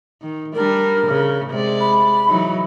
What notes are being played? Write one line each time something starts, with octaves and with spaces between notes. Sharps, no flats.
D#3
G3 D4 A#4
C#3
C3 G#3 D5
B5
E3 F#3 D#4